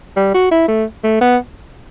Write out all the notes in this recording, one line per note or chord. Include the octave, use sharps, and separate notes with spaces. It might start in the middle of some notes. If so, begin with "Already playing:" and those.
G3
F#4
E4
A3
A3
B3